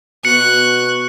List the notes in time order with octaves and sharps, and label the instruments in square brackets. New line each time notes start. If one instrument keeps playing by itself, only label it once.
[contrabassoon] B2 [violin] C#6 F#6 [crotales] C#7